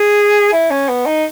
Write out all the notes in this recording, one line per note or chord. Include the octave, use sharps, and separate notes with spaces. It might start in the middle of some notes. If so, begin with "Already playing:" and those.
Already playing: G#4
E4
C#4
B3
D#4